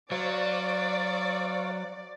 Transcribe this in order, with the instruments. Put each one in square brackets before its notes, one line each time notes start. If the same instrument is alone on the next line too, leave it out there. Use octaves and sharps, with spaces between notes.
[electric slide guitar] F#3 [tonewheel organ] C5 F5 C#6 [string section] D5